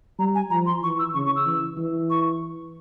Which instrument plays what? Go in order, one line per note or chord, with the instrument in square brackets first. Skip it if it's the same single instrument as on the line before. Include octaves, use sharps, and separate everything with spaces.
[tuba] G3 [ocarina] A#5
[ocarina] G#5
[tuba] F3 [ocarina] A#5
[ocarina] C6
[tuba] E3 [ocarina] C#6
[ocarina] E6
[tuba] C#3 [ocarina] C#6
[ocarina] C#6
E6
[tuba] E3
E3
[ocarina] C#6